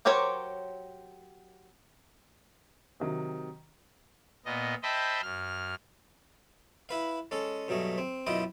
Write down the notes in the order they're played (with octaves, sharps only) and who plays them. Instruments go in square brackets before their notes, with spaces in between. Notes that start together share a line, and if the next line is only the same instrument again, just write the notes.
[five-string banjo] F#3 G4 A#4 C5 C#5
[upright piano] C3 D#3 F#3
[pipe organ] A#2 B3 D#5
C5 D#5 E5 G5 A5 B5
F#2 F6
[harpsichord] E4 B4 F5
G#3 C#4 A4
G2 B2 F#3 A3 G#4
C4
F#2 B2 E4 F4 D#5 G5